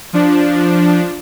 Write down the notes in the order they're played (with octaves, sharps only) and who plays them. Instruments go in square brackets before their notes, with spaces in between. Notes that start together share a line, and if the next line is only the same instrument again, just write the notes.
[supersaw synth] F3 D4